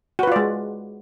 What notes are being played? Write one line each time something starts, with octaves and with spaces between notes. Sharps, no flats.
G#3 F4 F#4 B4 D5